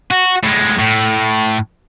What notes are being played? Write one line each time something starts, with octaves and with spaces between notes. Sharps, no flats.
F#4
A2 G#3
A2